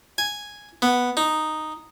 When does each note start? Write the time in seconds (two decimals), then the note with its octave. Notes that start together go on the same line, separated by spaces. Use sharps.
0.18 G#5
0.82 B3
1.17 D#4